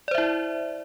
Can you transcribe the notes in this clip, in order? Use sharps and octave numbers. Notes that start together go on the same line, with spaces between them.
E4 C5 D5 E5